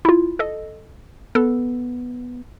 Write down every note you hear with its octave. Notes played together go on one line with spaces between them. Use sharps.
E4 F4
A4 D#5
B3 A4